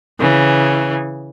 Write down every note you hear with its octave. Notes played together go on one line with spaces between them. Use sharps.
C#3 E3